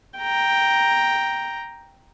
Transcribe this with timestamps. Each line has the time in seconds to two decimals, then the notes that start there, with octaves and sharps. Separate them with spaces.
0.19 G5 A#5